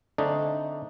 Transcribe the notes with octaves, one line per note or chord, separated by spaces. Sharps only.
D3 A3 C4 D4 D#4